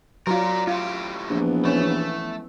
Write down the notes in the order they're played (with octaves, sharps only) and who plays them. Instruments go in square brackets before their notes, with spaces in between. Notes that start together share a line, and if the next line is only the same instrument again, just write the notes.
[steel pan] F#3 F4 [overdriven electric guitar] A#4 D5
[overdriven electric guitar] A2 G4 [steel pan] F4
[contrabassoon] A#1 [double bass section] E3 F3 B3
[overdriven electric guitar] A3 [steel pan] C#4